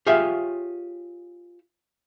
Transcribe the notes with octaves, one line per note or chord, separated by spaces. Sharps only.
F4 G4 G#4 C#5 E5 F5